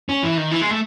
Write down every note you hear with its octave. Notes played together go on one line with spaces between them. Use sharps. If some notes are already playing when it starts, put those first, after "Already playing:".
C#4
E3
D#3
E3
G#3
A3